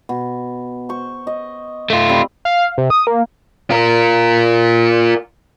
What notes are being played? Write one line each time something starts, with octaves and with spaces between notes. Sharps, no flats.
B2
C5 C#6
D#5
A3 F4
G3 C4
F5
C3
D#6
A#3
F4 A#4